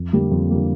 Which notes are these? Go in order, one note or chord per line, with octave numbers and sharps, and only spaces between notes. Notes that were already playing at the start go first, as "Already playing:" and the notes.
Already playing: F2
D3 G3 A#3
F2
D3 G3 A#3